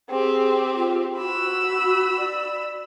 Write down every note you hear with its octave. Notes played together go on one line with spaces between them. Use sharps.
C4 G4 G#4
F4
F#4 B5 E6
D5